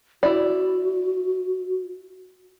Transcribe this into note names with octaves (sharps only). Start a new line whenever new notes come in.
E4 F#4 D5